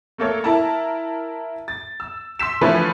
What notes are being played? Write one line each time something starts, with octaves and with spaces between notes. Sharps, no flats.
A3 A#3 A4 C#5
E4 A#4 A5 A#5
A6
E6
C6 E6 B6 E7
D3 E3 F3 A3 B4 C#5